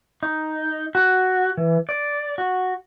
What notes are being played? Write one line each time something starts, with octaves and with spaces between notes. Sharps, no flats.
D#4
F#4
E3
D5
F#4